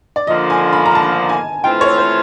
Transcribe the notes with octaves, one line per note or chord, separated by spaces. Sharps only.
D5
D3 F3 A#3 D#5
G#5
B5
A#5
A5
G#5
E3 A3 C4 F4 G5
C#5
C5